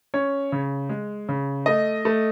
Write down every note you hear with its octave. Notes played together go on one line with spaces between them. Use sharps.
C#4 C#5
C#3
G#3
C#3
A3 D#5
A3